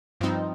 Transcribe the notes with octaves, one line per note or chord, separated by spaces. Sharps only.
G2 F3 C4 D#4